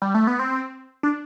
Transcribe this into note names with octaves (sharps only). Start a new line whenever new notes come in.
G3
A3
B3
C4
D4